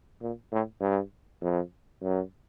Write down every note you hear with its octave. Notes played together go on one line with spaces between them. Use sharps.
A#2
A2
G2
F2
F#2